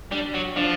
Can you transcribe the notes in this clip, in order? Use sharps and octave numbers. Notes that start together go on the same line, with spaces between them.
G3 D4
F#3
F3 D4